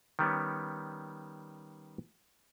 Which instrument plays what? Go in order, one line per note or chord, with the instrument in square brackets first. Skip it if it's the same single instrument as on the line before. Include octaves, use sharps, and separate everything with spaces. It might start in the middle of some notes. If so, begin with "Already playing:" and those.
[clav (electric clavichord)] D#3 G3 B3 C#4